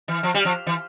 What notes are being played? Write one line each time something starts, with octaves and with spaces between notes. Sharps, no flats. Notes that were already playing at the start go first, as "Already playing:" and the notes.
E3
F3
G3
F3
E3